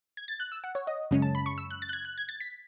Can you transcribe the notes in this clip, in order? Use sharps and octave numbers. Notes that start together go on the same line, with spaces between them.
G#6
A6
F#6
E6
F#5
C#5
D#5
F#2 C#3 G#3 C#4
A5
B5
C#6
E6
F#6
A6
F#6
G#6
F#6
G#6
A6
B6